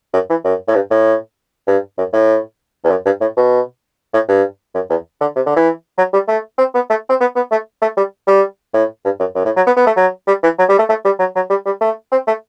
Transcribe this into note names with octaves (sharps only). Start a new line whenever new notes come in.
F#2
E3
F#2
A2
G2
A2
G2
F#2
A2
E2
F#2
G2
A2
B2
A2
G2
F#2
E2
D3
C3
D3
E3
F#3
G3
A3
C4
B3
A3
C4
B3
B3
A3
A3
G3
G3
A2
G2
F#2
F#2
A2
F#3
B3
B3
A3
F#3
G3
E3
F#3
G3
A3
A3
G3
F#3
F#3
G3
G3
A3
C4
A3